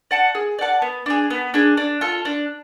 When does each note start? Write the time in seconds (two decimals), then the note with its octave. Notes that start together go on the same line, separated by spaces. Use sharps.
0.11 D5 F#5 A5
0.35 G#4
0.59 D5 F#5 A5
0.82 B3
1.06 D4 G#4
1.30 B3
1.54 D4 G#4
1.77 D4
2.01 F4 A4
2.25 D4